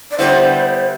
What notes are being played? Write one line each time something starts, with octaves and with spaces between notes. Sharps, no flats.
D5
D3 G3 B3 E4 C5